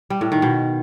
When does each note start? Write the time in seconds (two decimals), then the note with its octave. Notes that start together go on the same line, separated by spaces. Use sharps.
0.10 G3
0.21 A2
0.32 D#3
0.42 B2